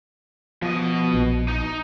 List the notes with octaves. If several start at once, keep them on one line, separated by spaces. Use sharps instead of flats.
B2 F3 D#5
A#1
D#4